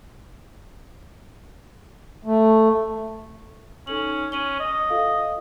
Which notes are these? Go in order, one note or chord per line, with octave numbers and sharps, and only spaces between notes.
A3
C#4 D#4 A4 F#7
C#4 D#7 F#7 G7
D#5
F4 A4 F5